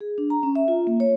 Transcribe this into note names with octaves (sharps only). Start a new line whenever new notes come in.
G#4
D4
A#5
C#4
E5
F4
A#3
C#5